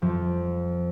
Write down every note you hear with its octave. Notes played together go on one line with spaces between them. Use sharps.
F2 F3